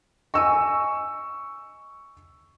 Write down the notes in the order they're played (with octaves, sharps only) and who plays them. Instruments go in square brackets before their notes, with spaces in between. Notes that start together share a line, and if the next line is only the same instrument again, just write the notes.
[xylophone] D#5 G#5 [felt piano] C#6 E6